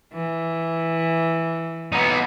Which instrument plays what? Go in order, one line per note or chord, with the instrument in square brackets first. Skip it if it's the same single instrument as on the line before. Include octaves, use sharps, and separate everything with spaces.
[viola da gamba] E3
[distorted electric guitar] B3 D#4